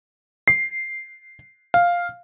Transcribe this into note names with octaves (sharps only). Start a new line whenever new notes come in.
C7
F5